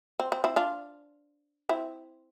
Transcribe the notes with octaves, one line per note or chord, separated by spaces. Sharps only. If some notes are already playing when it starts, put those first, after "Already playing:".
C4
C4
C4 E4
D4 F4
C4 E4